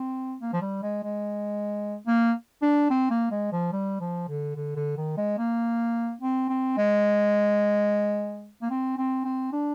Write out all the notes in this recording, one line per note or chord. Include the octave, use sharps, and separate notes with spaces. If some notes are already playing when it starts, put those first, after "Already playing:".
Already playing: C4
A#3
F3
G3
G#3
G#3
A#3
D4
C4
A#3
G#3
F3
G3
F3
D3
D3
D3
D#3
G#3
A#3
C4
C4
G#3
A#3
C4
C4
C4
D4